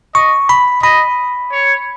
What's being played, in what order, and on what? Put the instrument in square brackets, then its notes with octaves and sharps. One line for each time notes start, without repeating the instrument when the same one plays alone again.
[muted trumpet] D#5 [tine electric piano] C#6
[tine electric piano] B5
[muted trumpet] D#5 [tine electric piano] B5
[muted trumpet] C#5